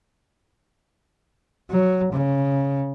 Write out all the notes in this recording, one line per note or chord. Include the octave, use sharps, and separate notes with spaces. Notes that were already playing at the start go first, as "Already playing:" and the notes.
F#3
C#3